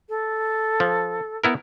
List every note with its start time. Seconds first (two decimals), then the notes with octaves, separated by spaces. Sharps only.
0.09 A4
0.80 F3
1.44 B3 E4 A#4